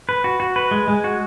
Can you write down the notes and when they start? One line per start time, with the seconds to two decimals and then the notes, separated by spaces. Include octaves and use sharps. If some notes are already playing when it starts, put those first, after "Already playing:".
0.09 B4
0.24 F#4
0.40 F#4
0.56 B4
0.71 G#3
0.88 G#3
1.04 F#4